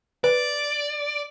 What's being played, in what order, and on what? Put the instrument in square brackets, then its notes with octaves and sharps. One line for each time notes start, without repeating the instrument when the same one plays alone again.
[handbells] B4 [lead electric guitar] D5